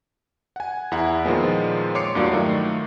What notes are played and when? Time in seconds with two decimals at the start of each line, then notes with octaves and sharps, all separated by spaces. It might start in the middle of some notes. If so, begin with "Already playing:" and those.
0.56 F#5 G#5
0.92 E2 E4 F#5
1.25 A#2 D#3 F3 G#3 B3
1.95 C#5 C6 D6 C7 C#7
2.15 E2 G2 A#3 F4 F#4 D5
2.31 D#3 F#3 A3 F4